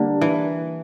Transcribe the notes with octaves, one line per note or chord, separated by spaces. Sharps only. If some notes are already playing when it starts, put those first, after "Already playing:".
Already playing: D3 G3 A#3 D4
E3